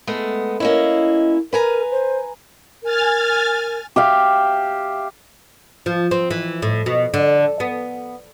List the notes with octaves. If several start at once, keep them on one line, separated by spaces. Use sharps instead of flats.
G#3 A3 B3
A#3 C#4 E4 D#5
A#4 B4 G#5 A#5
C5
A#4 G#5 F6 A6
G4 E5 F5
F3
C4
E3
A2
B2
D3
B3